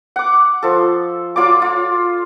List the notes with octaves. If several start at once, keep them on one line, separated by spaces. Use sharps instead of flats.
F#5 D6
F3 A4
F#3 F4 D5 D6
F4